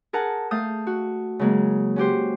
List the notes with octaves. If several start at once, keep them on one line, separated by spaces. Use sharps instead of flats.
G#4 A#4 F#5 A5
A3 F5 A5 D#6 G6
F#4
C#3 F#3 G#3 A#3
C#4 F#4 G4 C5